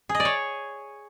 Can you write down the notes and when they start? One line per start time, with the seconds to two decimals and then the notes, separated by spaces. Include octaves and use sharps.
0.09 G#4
0.15 D#5
0.20 D5
0.25 C#5